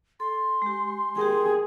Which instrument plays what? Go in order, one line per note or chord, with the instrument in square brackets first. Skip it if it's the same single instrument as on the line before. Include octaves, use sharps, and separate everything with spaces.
[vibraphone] A4 [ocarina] C6
[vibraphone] G#3 G4
[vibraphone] G4 A#4 G5 [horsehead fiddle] G#4